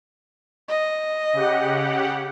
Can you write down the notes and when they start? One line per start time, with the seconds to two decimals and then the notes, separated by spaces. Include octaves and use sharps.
0.68 D#5
1.33 C#3 G4 F#5